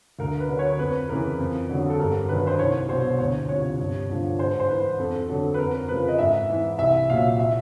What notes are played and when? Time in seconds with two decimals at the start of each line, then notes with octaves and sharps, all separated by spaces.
0.19 D2 A#4
0.40 B4
0.49 D3 F#3
0.59 C#5
0.79 F2 B4
1.09 C#3 E3 A#4
1.39 F2
1.69 D3 F#3
1.90 A4
2.00 G2 A#4
2.29 D#3 F#3 B4
2.47 C5
2.59 C2 C#5
2.89 B2 F#3 C5
3.19 D2 C#5
3.49 C3 F3 C#5
3.79 G2
4.09 D3 F3
4.39 G#2 C5
4.60 C5
4.69 E3 B4
4.98 F2 A4
5.29 D3 F#3 A4
5.54 B4
5.59 F2 A#4
5.88 C#3 F3 B4
6.08 D#5
6.18 G#2 E5
6.50 E3
6.78 C2 E5
7.10 A#2 F#3 F5
7.40 E5